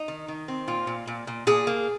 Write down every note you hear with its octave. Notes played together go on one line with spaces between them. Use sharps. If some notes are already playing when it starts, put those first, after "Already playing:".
Already playing: D#4
D#3
D#3
C4
A#2 F4
A#2
A#2
A#2
A#2 G#4
A#3